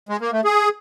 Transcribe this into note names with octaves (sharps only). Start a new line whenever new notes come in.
G#3
A#3
A3
G#4